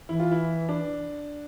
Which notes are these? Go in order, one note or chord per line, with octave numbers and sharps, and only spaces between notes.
E3 E4
F4
E4
D4